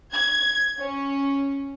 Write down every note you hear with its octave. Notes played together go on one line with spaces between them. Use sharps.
G#6
C#4